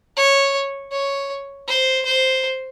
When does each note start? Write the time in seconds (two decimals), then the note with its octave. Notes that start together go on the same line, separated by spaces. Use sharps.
0.17 C#5
0.92 C#5
1.67 C5
2.05 C5